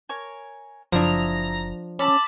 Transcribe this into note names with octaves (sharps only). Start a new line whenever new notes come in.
A#4 C#5 G#5
F#1 F3 D4 E4 E5 A#5 D#6
C#4 D5 A5 B5 E6 A6